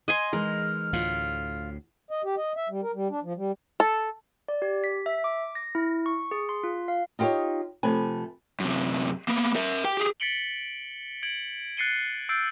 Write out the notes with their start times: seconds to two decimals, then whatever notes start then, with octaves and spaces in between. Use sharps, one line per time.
0.08 D#5 G#5 C6
0.33 E3 G#3 D#4 A#4 F6
0.93 D2 A2 F4
2.11 D#5
2.24 G4
2.37 D#5
2.57 E5
2.69 G3
2.83 A#4
2.94 G3
3.10 D4
3.23 F3
3.36 G3
3.80 A4
4.48 D5
4.62 G4
4.84 B6
5.06 E5
5.24 D6
5.55 A#6
5.75 E4
6.06 C#6
6.31 G#4
6.49 C6
6.63 F4
6.88 F5
7.19 D#4 F4 G4 B4 C#5 D#5
7.83 C3 F3 A3 B4 G#5
8.60 F#2 C3
9.28 A#3 B3
9.56 A#4 E5
9.84 G4 G5
9.97 G4 G#4
10.20 A6 B6 C#7 D7 F#7 G7
11.23 G#6 D7 F#7
11.77 F#6 A6 C7 C#7 D#7 G7
12.29 E6 F#6 G6 A6 C7 D7